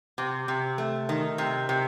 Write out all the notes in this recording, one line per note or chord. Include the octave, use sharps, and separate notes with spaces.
C3
C3
A3
D#3
C3
C3